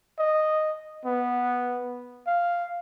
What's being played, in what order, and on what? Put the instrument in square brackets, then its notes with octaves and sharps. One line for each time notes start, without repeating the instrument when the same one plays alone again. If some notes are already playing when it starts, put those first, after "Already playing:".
[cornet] D#5
B3
F5